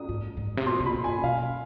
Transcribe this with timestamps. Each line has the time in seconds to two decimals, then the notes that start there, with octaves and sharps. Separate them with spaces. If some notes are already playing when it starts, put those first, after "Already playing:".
Already playing: D#6
0.09 G#2
0.37 G#2
0.57 C3
0.66 B2 C6
0.80 C3
0.86 B5
0.94 B2
1.04 G#2 G#5
1.23 B2 F5